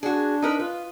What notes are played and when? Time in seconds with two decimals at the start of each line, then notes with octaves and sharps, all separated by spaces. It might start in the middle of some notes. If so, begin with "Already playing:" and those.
0.03 D4 F#4 G#4
0.42 D#4 A#4 B4
0.60 F4 B4